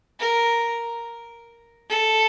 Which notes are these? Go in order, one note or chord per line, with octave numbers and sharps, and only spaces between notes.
A#4
A4